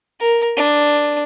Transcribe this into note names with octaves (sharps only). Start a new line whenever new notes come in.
A#4
D4